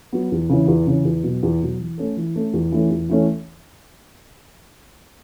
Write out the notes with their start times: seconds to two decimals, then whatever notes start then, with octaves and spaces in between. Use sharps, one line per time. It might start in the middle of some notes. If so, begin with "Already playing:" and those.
0.13 F#3 B3
0.32 E2
0.49 C#3 E3 C#4
0.68 E2
0.87 C#3 E3 C#4
1.05 E2
1.24 B2 F#3
1.43 E2
1.62 B2 F#3
1.79 E3
1.98 A3 C#4 A4
2.17 E3
2.36 A3 C#4 A4
2.54 E2
2.72 E3 A3 C#4
2.91 E2
3.09 E3 A3 C#4